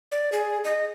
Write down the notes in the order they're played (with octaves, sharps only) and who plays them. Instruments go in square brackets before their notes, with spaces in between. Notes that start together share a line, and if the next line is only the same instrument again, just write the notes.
[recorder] D5
G#4
D#5